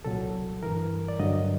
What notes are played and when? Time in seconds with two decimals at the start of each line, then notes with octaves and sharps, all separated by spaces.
0.05 C2 A#2 F#3 A4
0.63 G2 E3 A#4
1.08 D5
1.19 G2 D3 F#3 D#5